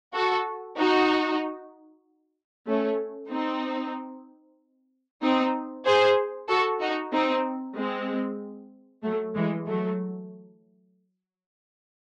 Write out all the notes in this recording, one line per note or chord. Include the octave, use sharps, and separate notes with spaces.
F#4 A4
D#4 F#4
A3 C#4
C4 D#4
C4 D#4
G#4 C5
F#4 A4
D#4 F#4
C4 D#4
G#3 C4
F#3 A3
E3 G#3
F#3 A3